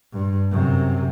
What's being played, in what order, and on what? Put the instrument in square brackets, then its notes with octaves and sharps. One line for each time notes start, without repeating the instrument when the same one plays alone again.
[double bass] G2
F#2 C3